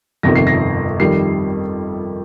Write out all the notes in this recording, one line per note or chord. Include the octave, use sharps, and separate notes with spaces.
G1 F2 C3 D#3 A#6
C7
A#6
F2 D#3 G3 C7